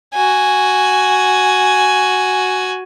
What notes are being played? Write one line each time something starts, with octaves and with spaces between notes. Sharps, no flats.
F#4 G#5